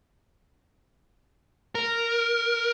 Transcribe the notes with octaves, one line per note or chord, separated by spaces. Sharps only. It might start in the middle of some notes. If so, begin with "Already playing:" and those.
A#4